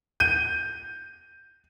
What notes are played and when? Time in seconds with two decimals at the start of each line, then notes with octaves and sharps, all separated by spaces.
0.20 G6 D#7